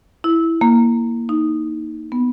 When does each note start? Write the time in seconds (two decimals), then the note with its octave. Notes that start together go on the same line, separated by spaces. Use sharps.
0.24 E4
0.61 A#3
1.29 D#4
2.12 B3